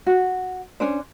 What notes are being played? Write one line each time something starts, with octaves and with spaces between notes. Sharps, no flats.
F#4
C#4 D4 C5